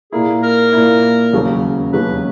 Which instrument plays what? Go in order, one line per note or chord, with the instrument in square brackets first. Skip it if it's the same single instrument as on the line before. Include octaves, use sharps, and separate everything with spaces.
[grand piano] A#2 A#3 E4 [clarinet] G#4
[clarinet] A#4
[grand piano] A#2 A#3 E4
E1 D#2 C#3 F#3 C#4
[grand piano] E1 D#2 C#3 F#3 C#4 [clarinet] B4